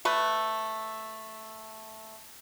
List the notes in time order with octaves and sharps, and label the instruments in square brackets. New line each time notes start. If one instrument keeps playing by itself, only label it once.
[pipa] A3 B4